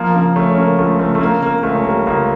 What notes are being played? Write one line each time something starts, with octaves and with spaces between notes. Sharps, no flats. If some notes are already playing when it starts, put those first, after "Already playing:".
Already playing: F3 A#3
C#3 A#3
C#3 A3 C#4
C#4
C#3 A#3
C#2 A3
C#2 A3
A3
C#3 A#3
C#3 A#3
A#3
C#2 A3
C#4
G3 A#3
C#2 A#3